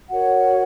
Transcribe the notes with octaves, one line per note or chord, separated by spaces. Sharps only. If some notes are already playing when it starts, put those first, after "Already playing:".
F#4 A#4 C#5 F#5